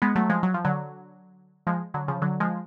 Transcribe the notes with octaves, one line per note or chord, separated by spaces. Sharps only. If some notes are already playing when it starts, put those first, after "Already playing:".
G#3 B3
F#3 A3
F3 G#3
F#3
F3
D3 F#3
F3 G#3
D3 F#3
C#3 F3
D3 F#3
F3 G#3